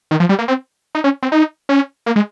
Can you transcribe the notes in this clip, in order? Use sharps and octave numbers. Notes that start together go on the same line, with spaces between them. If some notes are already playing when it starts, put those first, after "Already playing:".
D#3
F3
G3
A#3
C4
D#4
C#4
C4
D#4
C#4
A#3
G#3